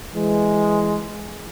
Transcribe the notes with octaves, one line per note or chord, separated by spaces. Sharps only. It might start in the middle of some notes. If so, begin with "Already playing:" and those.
E3 G#3